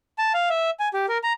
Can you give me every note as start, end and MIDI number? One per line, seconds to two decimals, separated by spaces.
0.18 0.33 81
0.34 0.49 77
0.50 0.70 76
0.79 0.89 80
0.93 1.06 67
1.09 1.18 70
1.23 1.33 82